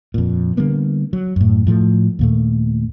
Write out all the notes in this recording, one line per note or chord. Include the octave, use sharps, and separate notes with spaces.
F2 A#2
D3 G3 A#3 B3
F#3
F#2 A2
A2 F3 G3 A3
D#2 A#2 A3